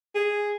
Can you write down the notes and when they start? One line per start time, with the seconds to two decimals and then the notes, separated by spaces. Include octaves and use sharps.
0.15 G#4